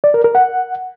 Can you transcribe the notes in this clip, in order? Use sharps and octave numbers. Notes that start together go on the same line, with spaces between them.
D5
A#4
A#4
F#5